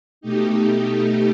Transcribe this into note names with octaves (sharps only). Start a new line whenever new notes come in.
B2 A3 D#4 G4